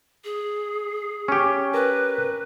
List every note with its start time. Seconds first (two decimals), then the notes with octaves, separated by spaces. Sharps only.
0.24 G#4
1.28 C#4 G4
1.74 A#4 B4